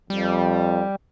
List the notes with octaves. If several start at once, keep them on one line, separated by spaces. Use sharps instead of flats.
F2 G3